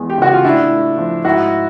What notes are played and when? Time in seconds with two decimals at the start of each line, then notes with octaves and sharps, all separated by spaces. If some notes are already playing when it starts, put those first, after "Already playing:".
Already playing: E2 G#3
0.10 G4
0.18 C#3 F#4
0.33 F4
0.44 A2 D4 E4
0.71 A2
0.98 F3
1.24 G#2 E4 F#4